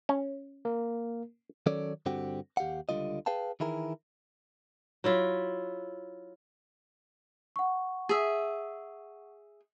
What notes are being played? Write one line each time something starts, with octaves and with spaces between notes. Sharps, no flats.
C#4
A#3 A#4
D#3 F#3 C#4 A4 C#5 D5
G2 D3 C4 F#4 G4
D#2 G4 F5 F#5
C#2 D3 G3 F4 D#5
G#4 B4 F5 G5 A5
D#3 E3 E4 G#4 A#4
F#3 E4 F4
F#5 C#6
G#4 E5